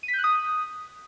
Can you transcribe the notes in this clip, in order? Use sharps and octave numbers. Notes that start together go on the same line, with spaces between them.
D#7
B6
G6
F#6
D#6